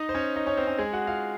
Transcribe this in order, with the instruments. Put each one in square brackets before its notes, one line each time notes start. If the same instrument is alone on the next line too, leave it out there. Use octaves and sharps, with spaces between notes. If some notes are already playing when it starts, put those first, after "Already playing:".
Already playing: [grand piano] D#4 D#5
C5
C#4 C#5
D#4 D#5
C#4 C#5
C4 C5
C#4
G#3 G#4
F#4 F#5
F4 F5